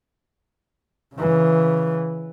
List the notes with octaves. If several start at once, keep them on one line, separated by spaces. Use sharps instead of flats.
C#3 E3